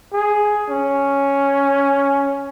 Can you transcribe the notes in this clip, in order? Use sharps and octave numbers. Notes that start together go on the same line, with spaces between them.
G#4
C#4